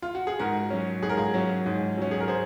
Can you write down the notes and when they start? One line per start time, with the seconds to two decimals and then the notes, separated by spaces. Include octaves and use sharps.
0.02 F4
0.15 F#4
0.27 G#4
0.39 G#2 F#4 A#4
0.70 F#3 C#4
1.02 G#2 G#4
1.09 A#4
1.17 F4 G#4
1.34 F#3 C#4
1.66 G#2
1.98 F#3 C#4
2.11 G#4
2.20 A#4
2.28 G#4 C5